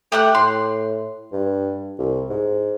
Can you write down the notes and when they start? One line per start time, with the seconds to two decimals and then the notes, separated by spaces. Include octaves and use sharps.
0.12 A3 G4 F#5 F#6
0.35 A2 C6
1.32 G2
1.99 C2
2.30 G#2